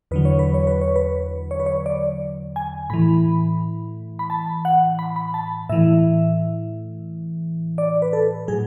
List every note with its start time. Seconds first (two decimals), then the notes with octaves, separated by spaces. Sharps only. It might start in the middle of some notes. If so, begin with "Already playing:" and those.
0.11 E2 D3 F#3 B4
0.25 C#5
0.39 B4
0.54 C#5
0.67 B4
0.81 C#5
0.96 B4
1.51 C#5
1.60 B4
1.66 C#5
1.86 D5
2.56 G#5
2.90 A2 E3 B5
4.19 B5
4.30 A5
4.65 F#5
4.99 B5
5.16 B5
5.34 A5
5.69 A2 E3 E5
7.78 D5
8.02 B4
8.13 A4
8.48 A2 F#3 G#4